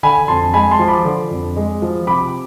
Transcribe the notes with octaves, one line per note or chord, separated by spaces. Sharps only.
D3 G#5 B5
F2 A5 C6
G#3 G#5 B5
A5 C6
F3
B5 D6
D3
F2
G#3
F3
C3 B5 D6